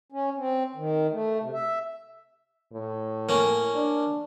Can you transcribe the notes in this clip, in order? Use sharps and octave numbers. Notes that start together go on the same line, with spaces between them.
C#4
C4
D#3
A3
C3
E5
A2
A#3 C#4
D4